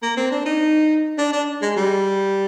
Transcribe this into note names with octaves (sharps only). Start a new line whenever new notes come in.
A#3
C4
D4
D#4
D4
D4
G#3
G3